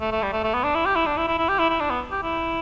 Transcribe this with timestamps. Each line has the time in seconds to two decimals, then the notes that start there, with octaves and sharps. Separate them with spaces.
0.01 A3
0.12 A3
0.23 G3
0.33 A3
0.44 A3
0.54 B3
0.64 D4
0.75 E4
0.86 G4
0.96 E4
1.06 D4
1.17 E4
1.27 E4
1.38 E4
1.49 G4
1.59 E4
1.70 E4
1.80 D4
1.90 B3
2.11 G4
2.23 E4